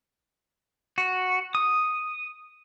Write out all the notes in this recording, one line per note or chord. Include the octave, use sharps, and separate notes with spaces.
F#4
D#6